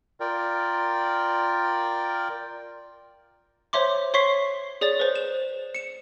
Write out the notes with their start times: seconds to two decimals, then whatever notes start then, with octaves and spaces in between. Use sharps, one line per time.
0.20 F4 A#4 D5 G5
3.73 C5 C#5 E5 C6 D6
4.14 C#5 C6 C#6 B6 C7
4.81 G#4 C#5 D5 A6
4.99 B4 C5
5.15 E7
5.75 C#7 E7